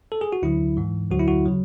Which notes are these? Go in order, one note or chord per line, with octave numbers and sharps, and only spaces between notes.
A4
G#4
F#4
D2 D3 F#3 E4
G#2 E3
D2 D3 F#3 F#4
E4
F#4
C#3 F#3